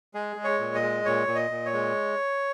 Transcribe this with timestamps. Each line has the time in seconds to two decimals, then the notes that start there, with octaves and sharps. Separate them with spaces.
0.14 G#3 G#4
0.36 G#3
0.44 C#5
0.59 A#2
0.75 D#5
0.82 G#3
1.05 A#2 C#5
1.27 A#2
1.35 D#5
1.51 A#2
1.65 C#5
1.73 G#3